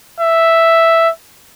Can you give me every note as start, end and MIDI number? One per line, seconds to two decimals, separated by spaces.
0.20 1.10 76